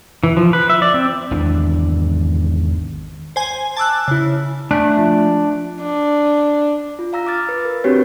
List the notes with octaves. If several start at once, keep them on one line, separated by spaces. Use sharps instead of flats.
E3
F3
B4
E5
D5
C4
G#1 E2 E3 D4
C5 G#5
A5 D6 E6 F#6
C#3 E4
A3 D4 G#5 F#6
F3
D4
F4
F5 A#5 E6 A#6
D6 E6 F6 A6
B4
A#4
C4 D4 F#4 G4 B4 C#5